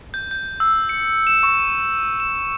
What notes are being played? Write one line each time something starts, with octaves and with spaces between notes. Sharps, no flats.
G6
G6
E6
C#7
E7
C#6
E7